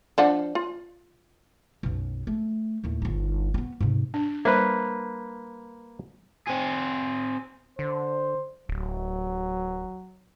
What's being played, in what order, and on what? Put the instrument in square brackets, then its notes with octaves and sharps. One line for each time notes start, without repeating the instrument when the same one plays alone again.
[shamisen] F3 D4 F#5
F4
[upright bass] B1 F#2
A3
D#2 A2
G1 D#4
B3 C#4
G#2 C3
[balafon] D4
[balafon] G3 C5 E5 [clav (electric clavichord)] A#3 B4
[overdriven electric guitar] C4 G#4
[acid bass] D3 [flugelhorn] C5
[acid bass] D1 [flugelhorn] F#3